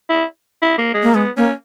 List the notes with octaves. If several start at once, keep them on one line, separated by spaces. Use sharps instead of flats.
E4
E4
A#3
G#3
A#3
G#3 B3
A#3 C#4